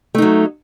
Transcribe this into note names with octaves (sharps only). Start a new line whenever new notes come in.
F#3 A3 D#4